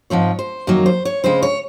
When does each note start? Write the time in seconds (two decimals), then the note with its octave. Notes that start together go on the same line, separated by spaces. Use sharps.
0.10 G#2 F3 C4 C#5
0.39 C5
0.67 F#2 D#3 F#3 A#3
0.86 C5
1.05 C#5
1.24 C#3 G#3 C4 C5
1.43 C#5